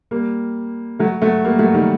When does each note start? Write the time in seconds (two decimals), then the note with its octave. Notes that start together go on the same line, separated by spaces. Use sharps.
0.11 G3 A#3
0.99 F#3 A3
1.22 F#3 A3
1.44 G3 A#3
1.59 F#3 A3
1.74 D#3 G3